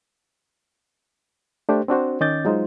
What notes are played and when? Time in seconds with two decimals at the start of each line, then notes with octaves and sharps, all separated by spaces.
1.69 A3 D4 G4 C5
1.88 C4 D4 F#4 C5
2.21 D#3 C#4 D#5 D6 G6 A6
2.45 F#3 G#3 D#4 F4 C5